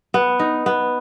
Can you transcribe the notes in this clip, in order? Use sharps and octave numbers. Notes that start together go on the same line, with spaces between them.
B3
D#4
B3